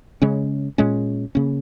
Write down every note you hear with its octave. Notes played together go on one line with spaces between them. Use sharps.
C#3 G#3 C#4
A#2 G#3 C#4
C#3 A#3 C#4